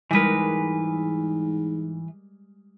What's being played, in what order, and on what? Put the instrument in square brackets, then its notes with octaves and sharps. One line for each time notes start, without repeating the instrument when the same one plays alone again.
[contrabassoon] G#2 [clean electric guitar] E3 B4 [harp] G3 G#3 A#4